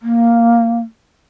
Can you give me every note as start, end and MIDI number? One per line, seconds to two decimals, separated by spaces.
0.03 0.79 58